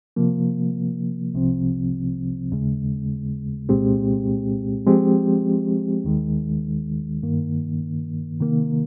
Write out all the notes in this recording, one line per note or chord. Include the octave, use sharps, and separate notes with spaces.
C3 F3 A#3
C2 C3 F3 C4
D#2 C#3 G#3
C2 A#2 G#3 C4 G4
F3 G#3 C4 G4
D#2 D#3 G#3
G2 D#3 A#3
C3 D#3 A#3